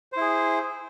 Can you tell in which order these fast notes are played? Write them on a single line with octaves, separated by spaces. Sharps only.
C5 E4 G#4